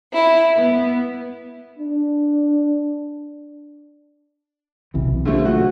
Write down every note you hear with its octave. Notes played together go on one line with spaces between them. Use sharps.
E4
B3
D4
B1 C3 E3
D3 F3 A3
F#4